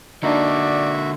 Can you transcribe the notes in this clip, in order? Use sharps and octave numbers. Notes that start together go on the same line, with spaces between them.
D3 A#3 D4 D#4 F#4 D5 E5